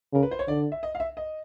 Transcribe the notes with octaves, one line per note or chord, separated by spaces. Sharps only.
C#3 A#4
B4
C5
C#5
D3 D5
E5
D#5
F5
E5
D#5